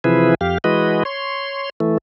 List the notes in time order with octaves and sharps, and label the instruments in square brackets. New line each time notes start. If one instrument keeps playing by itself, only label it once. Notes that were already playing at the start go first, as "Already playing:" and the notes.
[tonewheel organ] C3 E3 F3 E4 G#4 B4
F2 G4 F5
E3 G#3 F#4 B4 D#5
C#5 C6
E3 A3